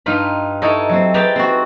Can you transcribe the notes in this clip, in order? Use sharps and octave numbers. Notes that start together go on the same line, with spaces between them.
G2 D#4 F4 B5
D#4 E4 A4 C#5 D#5
F#3 C4
G4 G#4 B4 G5 A5 A#5
C4 F#4